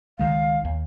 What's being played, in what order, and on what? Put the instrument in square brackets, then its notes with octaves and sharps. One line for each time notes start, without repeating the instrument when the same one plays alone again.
[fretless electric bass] C#2 D#3 G#3 [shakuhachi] F5
[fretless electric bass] D#2